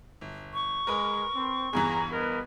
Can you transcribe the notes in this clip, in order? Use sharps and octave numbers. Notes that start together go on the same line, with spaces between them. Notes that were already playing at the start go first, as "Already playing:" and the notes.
G1
C#6
G#3 A#4 B4 B5
C4
E2 G2 E3 G#4 A#5
A#4 B4 D#5